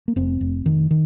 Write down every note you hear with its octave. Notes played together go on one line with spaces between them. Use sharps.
A#3
F1 C4
F1
F1 D#3
D#3